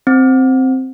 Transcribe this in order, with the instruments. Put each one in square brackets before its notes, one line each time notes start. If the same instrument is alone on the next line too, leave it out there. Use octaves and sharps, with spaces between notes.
[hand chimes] C4